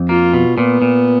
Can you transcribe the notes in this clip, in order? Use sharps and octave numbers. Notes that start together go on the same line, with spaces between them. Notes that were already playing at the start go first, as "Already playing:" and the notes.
Already playing: F2
A#3 F4
B2
A#2 B3
A#2